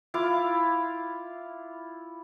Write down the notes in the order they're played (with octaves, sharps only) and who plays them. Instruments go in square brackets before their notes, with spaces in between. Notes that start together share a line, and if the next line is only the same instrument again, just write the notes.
[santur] E4 F4 F5 D6